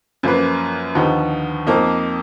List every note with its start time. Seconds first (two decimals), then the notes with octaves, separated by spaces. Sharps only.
0.23 F#2 F3 A#3 F4 B4
0.95 D#2 D3 F3 B3 D#4
1.67 F2 F3 A#3 D#4